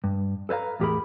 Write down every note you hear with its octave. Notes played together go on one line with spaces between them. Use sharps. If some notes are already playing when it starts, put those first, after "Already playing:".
G2
A4 B4 C5 F5 A#5
E2 A2 G4 G#4 A#4 B5